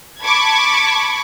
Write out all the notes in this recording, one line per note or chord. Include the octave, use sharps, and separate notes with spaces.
A5 B5 C#6 D6 G#6